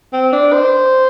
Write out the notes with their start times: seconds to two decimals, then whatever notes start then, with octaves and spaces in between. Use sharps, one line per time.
0.13 C4
0.33 D4
0.53 C5